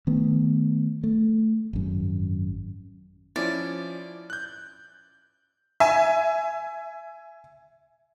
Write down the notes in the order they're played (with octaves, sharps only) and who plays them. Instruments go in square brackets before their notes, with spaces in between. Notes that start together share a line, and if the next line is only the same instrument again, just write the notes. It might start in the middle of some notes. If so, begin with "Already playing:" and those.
[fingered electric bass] D#3 A3 B3
A3
G#1 F#2
[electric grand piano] F3 C#4 E4 [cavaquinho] D5
[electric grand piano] F#6 G6
[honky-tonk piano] E5 G#5